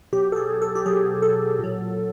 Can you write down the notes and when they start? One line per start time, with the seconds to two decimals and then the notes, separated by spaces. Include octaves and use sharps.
0.13 B2 F#3 G4
0.32 A4
0.36 G#4
0.62 A4
0.75 G4
0.86 B2 F#3 G#4
1.22 A4
1.59 A#2 F#3